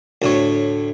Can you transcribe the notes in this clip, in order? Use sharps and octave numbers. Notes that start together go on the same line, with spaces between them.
D2 A2 C#5